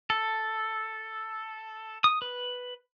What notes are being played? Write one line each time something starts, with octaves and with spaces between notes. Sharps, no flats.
A4
D#6
B4